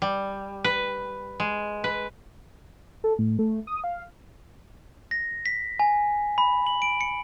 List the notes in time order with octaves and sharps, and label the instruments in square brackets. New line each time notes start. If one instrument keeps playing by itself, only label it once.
[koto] G3
B4
G#3
B4
[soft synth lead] A4
A2
A3
D#6
F5
[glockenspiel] A#6
B6
G#5
B5
F#7
D7
C#7